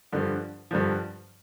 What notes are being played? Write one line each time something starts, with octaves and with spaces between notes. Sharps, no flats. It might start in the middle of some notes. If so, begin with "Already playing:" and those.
G2 D3 F3
G2 D3 F3